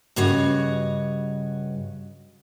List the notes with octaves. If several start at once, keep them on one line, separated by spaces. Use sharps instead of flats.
G2 C#3 F#4 C#5 D#5